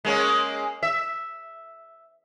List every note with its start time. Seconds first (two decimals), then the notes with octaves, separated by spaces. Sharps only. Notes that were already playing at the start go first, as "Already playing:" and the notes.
0.05 G#3 A#3 C#4
0.83 E5